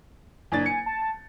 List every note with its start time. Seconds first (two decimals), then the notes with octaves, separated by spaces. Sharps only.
0.52 F#1 D4 G#5 A6
0.66 C#7
0.86 A5